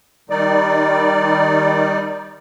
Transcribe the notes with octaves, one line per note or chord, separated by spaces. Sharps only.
D#3 G3 D#4 D5